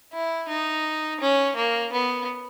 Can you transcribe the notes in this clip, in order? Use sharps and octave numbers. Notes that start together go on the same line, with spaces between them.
E4
D#4
C#4
A#3
B3